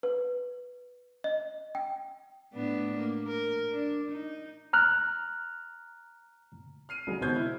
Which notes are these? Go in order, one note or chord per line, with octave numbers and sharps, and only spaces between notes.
B4
D#5
G5
A2 B3 D4
A#3
A#4
D4
D#4
A#5 F6 F#6
F6 C7 D#7
C#3 F#3 G#3
B2 D#3 B3 C5 G6 G#6
E4